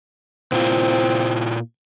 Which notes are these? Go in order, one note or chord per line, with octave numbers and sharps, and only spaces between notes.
A#2 C4 E4 F4